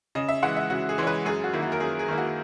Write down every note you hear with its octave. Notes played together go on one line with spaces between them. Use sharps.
C#3 D#5
E5
E3 G#3 F#5
E5
C#3 F#4
G#4
E3 G#3 C#5
B4
F#2 G#4
F#4
D#3 A#3 E4
F#4
A#4
F#2 G#4
G#4
D#3 A#3 E4
F#4